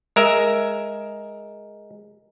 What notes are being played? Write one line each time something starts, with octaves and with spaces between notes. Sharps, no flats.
G#3 A#4 E5